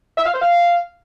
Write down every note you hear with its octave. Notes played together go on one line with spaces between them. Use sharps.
E5
F5
C5
F5